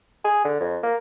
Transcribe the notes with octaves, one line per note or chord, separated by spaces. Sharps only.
G#4
D3
F2
A#3